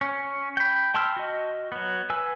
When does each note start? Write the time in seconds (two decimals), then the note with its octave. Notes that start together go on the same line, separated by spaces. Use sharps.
0.01 C#4
0.57 G5 B5
0.94 G5 A5 C6 E6 F6
1.17 F#4 D#5
1.72 F#3 B3
2.10 B4 G#5 E6